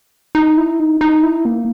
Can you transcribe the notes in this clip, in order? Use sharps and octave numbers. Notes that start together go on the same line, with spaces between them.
D#4
E4
D#4
D#4
E4
A#3